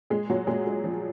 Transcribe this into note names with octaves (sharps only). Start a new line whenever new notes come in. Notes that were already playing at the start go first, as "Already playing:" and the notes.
A#2 G#3 G#4
A#2 F#3 F#4
A#2 G#3 G#4
G#3
F3